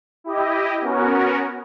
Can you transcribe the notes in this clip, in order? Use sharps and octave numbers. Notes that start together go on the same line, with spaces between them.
E4 G4 D#5
B3 C#4 F#4 A#4